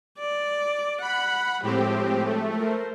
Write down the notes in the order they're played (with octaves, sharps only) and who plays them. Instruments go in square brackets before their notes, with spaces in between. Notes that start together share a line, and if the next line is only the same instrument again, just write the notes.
[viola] D5
[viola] F#5 [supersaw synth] B5
[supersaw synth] A2 C4 G4 [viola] F3 G#3
[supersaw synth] A3
[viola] A#4 C5